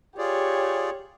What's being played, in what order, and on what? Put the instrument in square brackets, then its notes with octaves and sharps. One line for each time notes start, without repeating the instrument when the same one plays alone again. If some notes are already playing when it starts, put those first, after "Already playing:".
[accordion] F4 G#4 D5 [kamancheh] G4 C#5